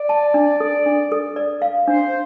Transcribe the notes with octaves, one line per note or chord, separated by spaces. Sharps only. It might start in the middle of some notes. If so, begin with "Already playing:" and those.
Already playing: D5
A5
D4
A4
D4
A4
D5
F5
D4 C5